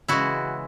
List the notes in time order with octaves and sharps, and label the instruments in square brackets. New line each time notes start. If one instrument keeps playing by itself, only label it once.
[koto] C#3 E3 G#3 E4 F#4